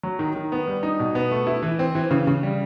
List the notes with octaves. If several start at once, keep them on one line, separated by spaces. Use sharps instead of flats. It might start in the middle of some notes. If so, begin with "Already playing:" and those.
F#3
D#3
D#3
B3
G3
D#4
B2
B3
A3
E4
E3
C4
E3
C#3
C#3
G3